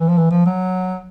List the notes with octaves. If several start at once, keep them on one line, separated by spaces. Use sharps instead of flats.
E3
F3
E3
F3
F#3